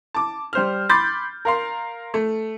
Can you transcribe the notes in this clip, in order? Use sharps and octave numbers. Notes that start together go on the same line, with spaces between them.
A5 D6
G3 C5 F6
B5 C6 D6 G6 A6
A#4 F5 C6
A3